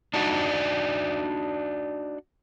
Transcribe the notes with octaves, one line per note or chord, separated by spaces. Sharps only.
D4 D#4 F#4 D5